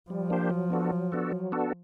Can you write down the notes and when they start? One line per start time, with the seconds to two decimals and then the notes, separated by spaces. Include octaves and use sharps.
0.10 F3 G3
0.30 A#3 D4 G4 C5
0.50 F#3
0.70 B3 D4 F#4 A4
0.91 F#3
1.12 B3 D4 F#4 A4
1.32 F#3
1.52 B3 D4 F#4 A4